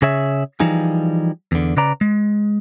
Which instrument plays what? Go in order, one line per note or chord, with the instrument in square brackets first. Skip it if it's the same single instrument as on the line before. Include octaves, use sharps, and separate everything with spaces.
[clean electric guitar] C#3 G#4 C#5 E5
E3 F3 G3 D#4 G#4
E2 D3
C#3 B4 D5 A#5
G#3